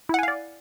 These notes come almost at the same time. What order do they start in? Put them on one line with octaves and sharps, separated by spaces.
E4 F#5 G#5 F5 D5